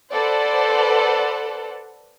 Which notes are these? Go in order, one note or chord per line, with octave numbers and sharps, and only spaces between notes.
A4 B4 C5 D5 F#5 A5